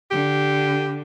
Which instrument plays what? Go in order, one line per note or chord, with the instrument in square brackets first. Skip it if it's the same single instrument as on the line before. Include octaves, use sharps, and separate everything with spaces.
[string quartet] D3 [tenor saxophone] G4